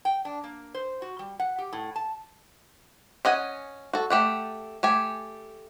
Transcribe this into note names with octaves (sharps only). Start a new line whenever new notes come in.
G5
D4
A#3
C5
F#4
G3
F#5
G4
A2
A5
C#4 D#5 F#5 G#5
F#4 A4
A3 G4 F#5
A3 G4 G#5